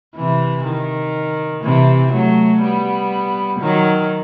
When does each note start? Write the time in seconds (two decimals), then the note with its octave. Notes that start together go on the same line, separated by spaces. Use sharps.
0.16 C3 E3
0.65 D#3
1.63 C3 E3
2.12 F#3 A3
2.62 G3 B3
3.60 D#3 F#3